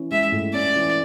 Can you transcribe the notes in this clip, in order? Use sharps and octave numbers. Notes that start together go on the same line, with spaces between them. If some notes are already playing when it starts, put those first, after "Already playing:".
Already playing: E3 C#4
G#3 E5
A2
C#4 D5
E3